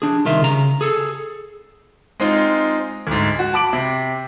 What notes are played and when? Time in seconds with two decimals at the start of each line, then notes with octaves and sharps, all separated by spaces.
0.02 D4 G#4
0.25 C2 D#3 F4 E5
0.42 C#3 A#5
0.81 G#4 A4
2.20 G#3 C4 D#4 F4
3.07 D2 G#2
3.39 F#4
3.53 A5 B5 D6 D7 F#7
3.73 C3